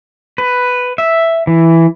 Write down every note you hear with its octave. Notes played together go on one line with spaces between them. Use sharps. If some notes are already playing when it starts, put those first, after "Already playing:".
B4
E5
E3